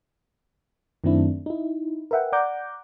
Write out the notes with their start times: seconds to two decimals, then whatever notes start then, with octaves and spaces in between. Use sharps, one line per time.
1.04 F#2 D#3 A3 C4 D4 E4
1.46 D#4 E4
2.11 A#4 B4 E5 F#5 G5
2.32 D5 F#5 A#5 D6 G6